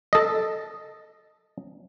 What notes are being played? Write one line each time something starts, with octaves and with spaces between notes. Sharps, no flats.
A4 D#5